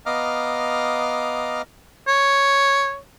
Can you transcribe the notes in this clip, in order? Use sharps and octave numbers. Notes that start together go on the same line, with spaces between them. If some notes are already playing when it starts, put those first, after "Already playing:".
B3 D#5 F5 A#5 D6 F6
C#5